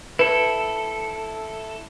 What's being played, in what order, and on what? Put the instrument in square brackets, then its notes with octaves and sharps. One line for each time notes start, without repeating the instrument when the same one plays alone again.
[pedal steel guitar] E4 A4 [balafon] B4